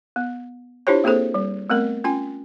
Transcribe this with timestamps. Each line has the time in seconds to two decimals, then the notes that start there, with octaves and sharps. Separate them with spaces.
0.16 B3
0.87 D4 E4 F4 G4 C5 C#5
1.04 A#3 C4 G#4 A4 C5
1.34 G3
1.70 A3 B3 C4 A#4
2.04 C#4 F4 G#5